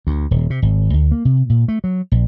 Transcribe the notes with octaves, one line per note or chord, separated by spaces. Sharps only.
D2
D#1
C3
G#1
D2
A#3
C3
A#2
A3
F#3
A#1